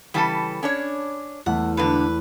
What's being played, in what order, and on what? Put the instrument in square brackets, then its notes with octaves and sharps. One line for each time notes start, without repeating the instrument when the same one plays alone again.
[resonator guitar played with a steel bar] C#3 E3 G3 [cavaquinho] A4 A5 B5
[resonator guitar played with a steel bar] C#4 D4 C#5
[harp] E2 A3 [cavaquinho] F#5
[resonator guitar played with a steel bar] G2 D3 [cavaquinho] B4